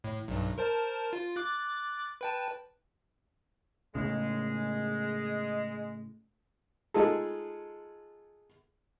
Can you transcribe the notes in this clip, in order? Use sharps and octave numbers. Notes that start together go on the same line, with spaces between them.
A2
B1 G2
A#4 C5 A5
F4
D6 F#6 A6
B4 G5 A5
A2 C#3 G#3
G#3 D#4 F4 G#4 A4